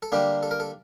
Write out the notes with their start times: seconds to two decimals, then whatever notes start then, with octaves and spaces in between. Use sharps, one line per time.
0.02 A4
0.12 D3 G3 A#3 D4 G4
0.43 A4
0.51 A#4
0.60 A4